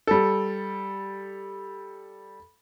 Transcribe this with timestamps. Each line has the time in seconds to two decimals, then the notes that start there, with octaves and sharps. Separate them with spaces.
0.07 G3 A4